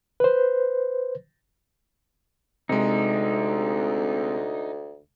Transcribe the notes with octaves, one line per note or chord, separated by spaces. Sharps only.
B4 C5
D2 C3 G#3 D#4